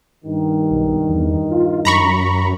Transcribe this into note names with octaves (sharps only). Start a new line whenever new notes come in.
G2 D#3
B1
E2
F4
F#2 A#5 B5 C#6